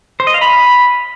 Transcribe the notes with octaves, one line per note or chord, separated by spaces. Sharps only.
C5
D#5
F5
B5